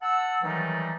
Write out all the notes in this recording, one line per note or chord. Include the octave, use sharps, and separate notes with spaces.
F#5 A5 E6
D#3 E3 F#3 G3 A3 D#4